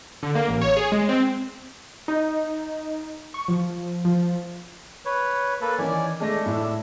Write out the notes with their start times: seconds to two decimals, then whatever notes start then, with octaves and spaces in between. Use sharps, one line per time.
0.23 D3
0.35 A#3
0.48 A1
0.61 C#5
0.77 G#4
0.92 G#3
1.09 C4
2.08 D#4
3.34 C#6
3.48 F3
4.05 F3
5.05 B4 C#5
5.61 A#3 A4 B4
5.78 D#3 E3 C#4 D5 G#5
6.20 G#3 A3 D4 A#6
6.46 A2 E4